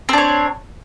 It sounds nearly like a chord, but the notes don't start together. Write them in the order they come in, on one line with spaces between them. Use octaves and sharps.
C4 D4 C#5